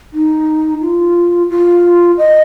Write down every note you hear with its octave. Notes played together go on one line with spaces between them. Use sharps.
D#4
F4
F4
D#5